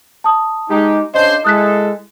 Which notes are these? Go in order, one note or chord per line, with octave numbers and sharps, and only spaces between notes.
A5 D#6
G#3 D#4 G4
C#3 D4 C5 D#5
G#3 E4 A4 D#6 F#6 B6